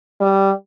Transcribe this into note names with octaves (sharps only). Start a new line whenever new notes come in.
G3